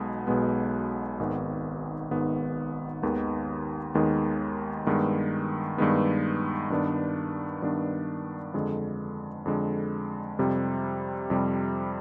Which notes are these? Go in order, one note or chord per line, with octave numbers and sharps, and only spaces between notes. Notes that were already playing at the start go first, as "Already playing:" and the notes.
Already playing: B1 B2 G#3 B3
B1 B2 G#3 B3
G#1 G#2 D#3 B3
G#1 G#2 D#3 B3
D#2 D#3 G#3 B3
D#2 D#3 G#3 B3
G2 D#3 G#3 B3
G2 D#3 G#3 B3
G2 D#3 B3 D4
G2 D#3 B3 D4
F2 D3 G#3
F2 D3 G#3
F2 C3 G3
F2 C3 G3